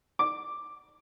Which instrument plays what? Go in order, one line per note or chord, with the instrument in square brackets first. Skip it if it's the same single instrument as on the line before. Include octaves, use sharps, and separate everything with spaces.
[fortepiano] D6